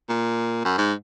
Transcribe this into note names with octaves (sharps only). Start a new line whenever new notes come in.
A#2
F#2
G#2